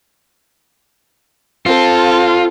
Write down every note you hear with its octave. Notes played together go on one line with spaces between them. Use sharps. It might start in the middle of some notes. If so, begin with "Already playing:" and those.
C4 F4 A4